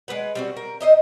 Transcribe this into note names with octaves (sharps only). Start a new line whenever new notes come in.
G#3 C4 B4 F#5
G3 C4 F#4
A#4
D#4 C5 D#5 E5